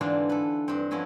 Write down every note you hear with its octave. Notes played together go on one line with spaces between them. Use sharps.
G#2 D3 E3 C4 D4 F4
A4 B4
G2 C4
F3 B3 C#4 E4 D#5